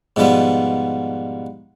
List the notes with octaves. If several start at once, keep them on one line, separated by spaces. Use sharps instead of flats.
G#2 B2 F3 G3 B3